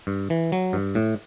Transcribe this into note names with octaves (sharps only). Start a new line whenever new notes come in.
G2
E3
F#3
G2
A2